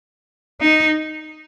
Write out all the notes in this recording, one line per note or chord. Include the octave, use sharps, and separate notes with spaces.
D#4